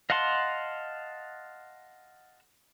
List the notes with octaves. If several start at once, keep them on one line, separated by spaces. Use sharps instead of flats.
D#5 F5 F#5 A5 C6